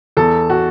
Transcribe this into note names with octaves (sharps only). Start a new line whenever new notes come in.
E2 A4
F#4